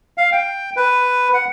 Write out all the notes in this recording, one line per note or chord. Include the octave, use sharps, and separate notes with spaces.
F5
G5
B4
F#5